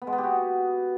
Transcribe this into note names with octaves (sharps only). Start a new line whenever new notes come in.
B3
G#3
B3
G4
F#4